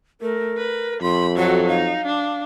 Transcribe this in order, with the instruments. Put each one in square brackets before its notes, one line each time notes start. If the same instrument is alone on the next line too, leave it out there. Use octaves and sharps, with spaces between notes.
[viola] A3 [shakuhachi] A#4
[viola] B4
[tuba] F2 [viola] B5 [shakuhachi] C6
[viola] F#3 A4 [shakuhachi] F#4
[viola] D#4 [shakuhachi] F5
[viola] D4